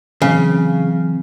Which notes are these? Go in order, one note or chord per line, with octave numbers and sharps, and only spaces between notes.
C#3 E3 F#3 C4